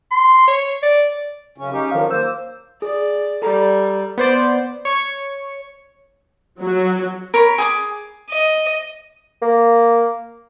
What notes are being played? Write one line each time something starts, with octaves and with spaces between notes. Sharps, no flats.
C6
C#5
D5
F#2 C#3 C#4
C#4 D#4 G4
D#3 F3 F#3 A#4 F5
A#3 C5 E6
G#4 D5
G3 A4 A#5
B3 C5 D5
C#5 C#6
F#3
A#4 C#5 B5
G#4 G#5 D6
D#5
A#3